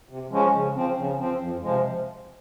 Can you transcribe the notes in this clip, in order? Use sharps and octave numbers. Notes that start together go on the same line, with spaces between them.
C3
F3 G#3 C#4
C#3
F3 C4
C#3
F3 C4
F2
C3 F3 G#3